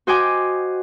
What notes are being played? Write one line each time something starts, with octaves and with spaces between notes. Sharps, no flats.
F#4 C5 D#5 G5 G#5 D6